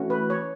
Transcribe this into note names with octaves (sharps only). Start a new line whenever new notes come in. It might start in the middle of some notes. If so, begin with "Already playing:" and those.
Already playing: E3 A3 C#4 F#4
B4
C#5